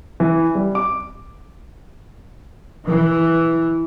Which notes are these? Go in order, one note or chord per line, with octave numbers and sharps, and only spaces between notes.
E3
G3
D6
E3